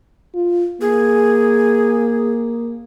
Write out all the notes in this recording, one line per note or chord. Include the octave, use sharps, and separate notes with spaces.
F4
A#3 G#4